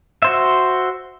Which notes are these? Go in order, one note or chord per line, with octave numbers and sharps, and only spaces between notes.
F#4 C5 E5